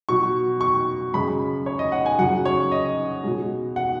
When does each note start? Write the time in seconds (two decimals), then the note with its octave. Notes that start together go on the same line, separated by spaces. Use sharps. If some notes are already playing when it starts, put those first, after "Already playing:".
0.09 B2 F#3 C#6
0.61 C#6
1.13 F#2 C#3 G#3 B5
1.66 C#5
1.79 D#5
1.92 F#5
2.06 G#5
2.18 F#2 C#3 F#3 F#5
2.45 C#5
2.72 D#5
3.24 B2 G#3
3.76 F#5